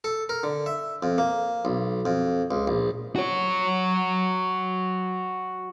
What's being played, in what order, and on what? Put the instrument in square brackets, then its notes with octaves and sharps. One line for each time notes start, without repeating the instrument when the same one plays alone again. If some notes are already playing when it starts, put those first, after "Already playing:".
[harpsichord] A4
A#4
D3
E5
F2
A#3
B1
F2
C#2
A#1
[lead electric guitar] F#4 C#5